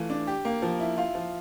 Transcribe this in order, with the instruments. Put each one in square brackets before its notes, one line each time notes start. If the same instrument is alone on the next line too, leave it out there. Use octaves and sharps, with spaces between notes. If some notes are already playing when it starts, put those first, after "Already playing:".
Already playing: [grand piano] E3 A3 F4
D4
G4
A#3
F3
E4
F4
F3